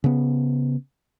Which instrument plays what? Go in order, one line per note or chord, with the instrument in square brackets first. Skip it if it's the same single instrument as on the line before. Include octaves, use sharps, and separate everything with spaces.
[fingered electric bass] C#3 B3